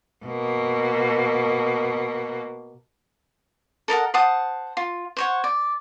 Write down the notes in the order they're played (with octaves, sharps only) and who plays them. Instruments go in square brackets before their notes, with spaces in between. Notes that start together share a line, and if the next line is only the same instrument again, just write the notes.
[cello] B2 A#3
[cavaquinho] A4 A#4 D#5 F#5
C5 F#5 A5 D#6
F4
C5 C#5 F#5
D5